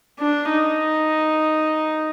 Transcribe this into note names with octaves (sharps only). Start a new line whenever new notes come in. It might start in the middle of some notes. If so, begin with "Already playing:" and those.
D4
D#4